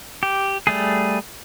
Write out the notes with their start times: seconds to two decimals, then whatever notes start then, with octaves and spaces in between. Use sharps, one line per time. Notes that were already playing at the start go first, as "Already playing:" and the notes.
0.23 G4
0.67 G3 A3 G#4